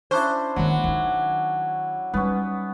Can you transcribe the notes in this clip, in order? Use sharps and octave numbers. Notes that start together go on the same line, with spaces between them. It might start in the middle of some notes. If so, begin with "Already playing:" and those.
C#4 D4 E4 C5
D#3 F#3 A#3
D#3 D#4
G3 B3 C#4 D#4